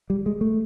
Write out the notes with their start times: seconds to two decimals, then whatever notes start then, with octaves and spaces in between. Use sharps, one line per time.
0.10 G3
0.26 G#3
0.41 A3